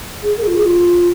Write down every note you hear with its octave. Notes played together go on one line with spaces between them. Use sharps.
G#4
A#4
G#4
F4
G#4
F4